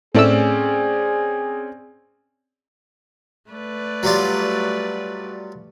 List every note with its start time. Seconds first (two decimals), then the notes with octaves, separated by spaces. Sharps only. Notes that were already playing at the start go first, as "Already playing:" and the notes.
0.14 A2 A3 C4 C#4 G#4 D5 E6
3.50 A3 B4 D5
4.03 F#3 G3 F4